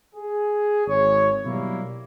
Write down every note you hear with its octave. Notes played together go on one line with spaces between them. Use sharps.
G#4
G#1 C#5
B2 F#3 G3 A#3 E4